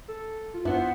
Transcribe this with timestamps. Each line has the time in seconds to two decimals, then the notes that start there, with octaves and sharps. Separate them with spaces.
0.08 A4
0.54 F4
0.65 F#2 B3 D4 E4 C5 E5 F#5